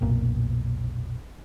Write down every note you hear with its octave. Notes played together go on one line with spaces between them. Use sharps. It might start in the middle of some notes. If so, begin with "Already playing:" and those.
F1 B1 A#2